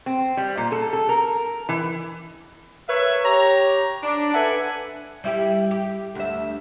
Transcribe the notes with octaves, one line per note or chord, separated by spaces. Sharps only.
C4
G3
A#2
A4
A4
A#4
E3
A#4 B4 C#5 E5
G4 C#5 A#5
D4
A4 B4 E5 F#5 G#5
G3 E4 G4
G4
D2 E5